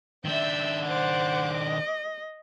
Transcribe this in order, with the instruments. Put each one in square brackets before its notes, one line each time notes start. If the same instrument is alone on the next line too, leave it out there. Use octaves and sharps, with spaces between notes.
[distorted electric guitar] D#3 D4 [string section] E5 E6 G6
[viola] C5 F#5 [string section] D6 F#6
[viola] D#5